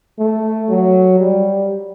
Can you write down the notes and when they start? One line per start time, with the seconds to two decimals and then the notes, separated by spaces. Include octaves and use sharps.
0.19 A3
0.70 F#3
1.20 G3